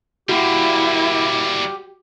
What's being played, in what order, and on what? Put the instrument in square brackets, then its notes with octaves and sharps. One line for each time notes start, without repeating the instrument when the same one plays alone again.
[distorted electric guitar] G3 A#3 [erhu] E4 [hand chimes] F#4 [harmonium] G4